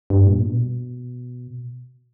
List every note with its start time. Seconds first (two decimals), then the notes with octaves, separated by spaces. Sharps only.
0.10 G2
0.26 A#2
0.43 B2